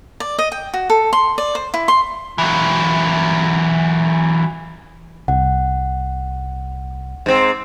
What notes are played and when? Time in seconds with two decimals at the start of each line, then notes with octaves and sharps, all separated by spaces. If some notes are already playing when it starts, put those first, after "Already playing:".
0.20 D5
0.39 D#5
0.52 G5
0.74 F#4
0.90 A4
1.13 C6
1.38 D5
1.55 C5
1.74 E4
1.88 C6
2.38 E3 F#3
5.28 C2 F#5
7.26 G#2 C4